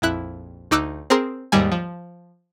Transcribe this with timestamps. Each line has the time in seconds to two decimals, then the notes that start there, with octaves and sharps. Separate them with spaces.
0.02 A#1 F2 E4 F#6
0.71 D2 D#4 D6 E6 F#6
1.10 C4 G#4 A#4 C6
1.52 D#2 G#2 D#3 G3 G#5
1.72 F3